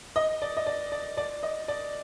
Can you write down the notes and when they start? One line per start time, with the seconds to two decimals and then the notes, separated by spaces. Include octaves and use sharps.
0.16 D#5
0.42 D5
0.57 D#5
0.67 D5
0.92 D5
1.17 D5
1.43 D#5
1.68 D5